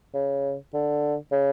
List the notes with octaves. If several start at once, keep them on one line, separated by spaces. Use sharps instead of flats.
C#3
D3
C#3